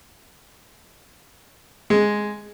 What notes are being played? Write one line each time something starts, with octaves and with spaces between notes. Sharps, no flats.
G#3